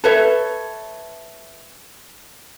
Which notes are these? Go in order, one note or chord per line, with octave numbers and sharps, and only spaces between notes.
A4 B4 C#5 E5